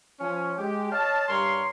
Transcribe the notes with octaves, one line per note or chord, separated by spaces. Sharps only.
F3 C#4
G#3 G4
C#5 D#5 F5 A5
G2 G3 A#4 C#5 C6